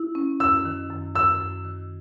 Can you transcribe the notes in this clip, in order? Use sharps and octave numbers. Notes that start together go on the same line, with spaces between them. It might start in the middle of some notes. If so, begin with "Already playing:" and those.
Already playing: E4
C#4
F#2 E6
D#3
F#2
F#2 E6
F#2
D#3